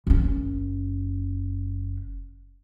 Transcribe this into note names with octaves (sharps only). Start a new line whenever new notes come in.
F#1 C#4